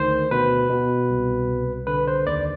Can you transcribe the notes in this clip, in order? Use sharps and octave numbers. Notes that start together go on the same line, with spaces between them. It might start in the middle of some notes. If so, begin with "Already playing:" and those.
Already playing: D2 D#3 C5
B2 B4
B2
C2
C2
D3 B4
C5
D#2 D5